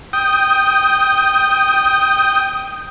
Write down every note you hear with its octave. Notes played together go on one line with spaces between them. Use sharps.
G5 D#6